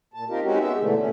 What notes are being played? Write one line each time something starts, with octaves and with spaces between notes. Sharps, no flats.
A#2 A5
C4 D#4 F4 G4 A#4
G#3 C4 C#4 D#4 F#4 G4
G#3 B3 E5
G#2 B2 D3 E3 A3
A#2 A3 C#4